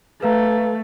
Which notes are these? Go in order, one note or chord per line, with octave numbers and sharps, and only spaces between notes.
A3 B4 F5 A#5